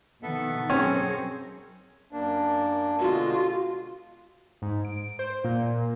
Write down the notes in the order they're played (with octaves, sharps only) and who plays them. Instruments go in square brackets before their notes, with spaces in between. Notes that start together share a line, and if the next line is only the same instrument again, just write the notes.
[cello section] B2 D#3 [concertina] B3 A4 E5
[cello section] F#3 G#4 A#4 [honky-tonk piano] C4 [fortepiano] C#4
[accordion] F#2 A#3 D4
[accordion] B2 D3 G#3 [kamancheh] F4 [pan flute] F#4
[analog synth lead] G#2
D7
C5
A#2